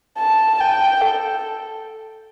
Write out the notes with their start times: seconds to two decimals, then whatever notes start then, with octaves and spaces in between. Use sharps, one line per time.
0.19 A5
0.61 G5
1.02 A4